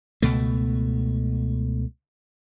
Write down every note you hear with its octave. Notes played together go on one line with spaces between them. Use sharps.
C#2 B2 A3